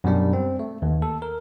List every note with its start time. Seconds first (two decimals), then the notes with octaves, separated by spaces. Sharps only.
0.04 F#2 B2 G3 D4
0.33 C4
0.59 A3
0.82 D#2
1.02 A4
1.22 A#4